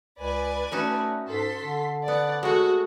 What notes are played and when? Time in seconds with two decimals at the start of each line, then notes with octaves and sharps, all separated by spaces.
0.20 C#2 B4 D5 G#5
0.72 A3 C#4 D#4 F#4
1.29 G#2 A4 C6 B6
1.63 D3
2.08 B3 D5 F#5
2.43 G#3 A3 F#4